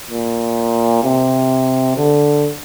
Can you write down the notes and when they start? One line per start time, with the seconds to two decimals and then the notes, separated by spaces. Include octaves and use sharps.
0.10 A#2
1.04 C3
1.97 D3